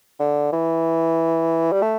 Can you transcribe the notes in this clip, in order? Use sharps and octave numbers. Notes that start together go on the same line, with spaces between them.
D3
E3
G3
A3